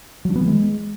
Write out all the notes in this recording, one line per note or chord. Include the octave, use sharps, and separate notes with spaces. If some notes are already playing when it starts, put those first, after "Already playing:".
F#3
D4
B3
E3
G#3